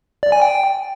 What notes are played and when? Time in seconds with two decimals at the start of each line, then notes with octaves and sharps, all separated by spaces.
0.23 D5
0.32 G#5
0.42 G5